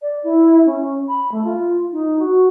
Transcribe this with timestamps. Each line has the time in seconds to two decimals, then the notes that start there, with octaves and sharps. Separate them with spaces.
0.02 D5
0.24 E4
0.66 C#4
1.08 B5
1.32 A3
1.44 F4
1.92 D#4
2.19 F#4